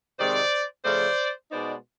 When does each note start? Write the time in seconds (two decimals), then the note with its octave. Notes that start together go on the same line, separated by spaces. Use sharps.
0.18 C3 D#3 G#3 C4 C5 D5
0.84 C#3 F3 A3 C5 D5
1.51 B2 G#3 B3 D#4 C5 D5